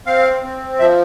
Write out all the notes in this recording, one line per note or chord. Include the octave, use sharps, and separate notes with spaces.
C4 F5
C4
F3 E5